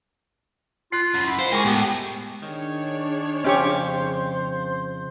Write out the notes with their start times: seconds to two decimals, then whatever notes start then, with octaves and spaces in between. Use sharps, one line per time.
0.92 F4 F#6 C7
1.14 F#2 A#5 B5
1.26 E4
1.39 C5 F5 G5
1.52 G#3 G#4 A#4 G5 C#6 D6
1.65 A2 B3 G4
2.42 D#3 D4 G#4 C#5
3.44 F2 C#3 C#4 G4 C5 F5 C#6